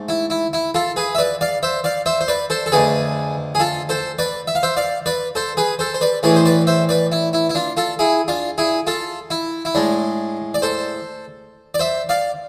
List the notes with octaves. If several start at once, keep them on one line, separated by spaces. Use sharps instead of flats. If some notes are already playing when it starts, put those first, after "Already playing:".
Already playing: G#2 A3
E4
E4
E4
F4 A4
G#4 B4
E5
B4 D5
D5 F5
C5 E5
D5 F5
C5 E5
C5
B4 D5
A4 C5
A4
F2 D3 A3 G#4 B4
G#4
F4 A4
A4 C5
B4 D5
E5
F5
C5 E5
D5 F5
B4 D5
A4 C5
G#4 B4
A4 C5
C5
B4 D5
A2 E3 A3 G#4 B4
C5
B4 D5
C5 E5
B4 D5
E4
E4
E4
D4 F4
F4 A4
E4 G#4
D4 F4
E4 G#4
F4 A4
E4
E4
A2 G#3 D4
D5
A4 C5
D5
C5 E5
D5 F5